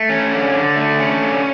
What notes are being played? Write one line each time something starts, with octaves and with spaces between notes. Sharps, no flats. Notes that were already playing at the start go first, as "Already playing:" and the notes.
Already playing: A3
C#4
D3
D3
A3
C#4
D3